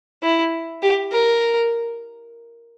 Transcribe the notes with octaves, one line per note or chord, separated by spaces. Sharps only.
E4
G4
A#4